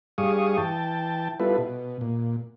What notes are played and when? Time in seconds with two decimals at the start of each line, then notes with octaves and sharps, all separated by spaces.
0.18 G2 G3 G#4 F5 C#6 D#6
0.57 E3 G5 A5
1.40 G3 B3 E4 F4 A4 B4
1.58 B2
2.01 A#2